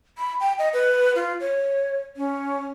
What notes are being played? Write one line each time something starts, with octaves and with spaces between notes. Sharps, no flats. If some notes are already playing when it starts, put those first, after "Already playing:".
B5
G5
D#5
B4
F4
C#5
C#4